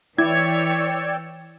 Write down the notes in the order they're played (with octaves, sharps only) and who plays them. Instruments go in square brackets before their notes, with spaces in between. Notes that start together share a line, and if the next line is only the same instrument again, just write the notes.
[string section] E3 C#5 [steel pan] E4 [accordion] D5 G5 E6 [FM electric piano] G#6